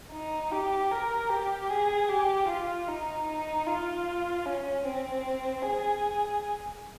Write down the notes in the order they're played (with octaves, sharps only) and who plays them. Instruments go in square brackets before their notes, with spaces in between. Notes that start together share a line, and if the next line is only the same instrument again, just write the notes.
[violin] D#4
G4
A#4
G4
G#4
G4
F4
D#4
D#4
F4
C#4
C4
G#4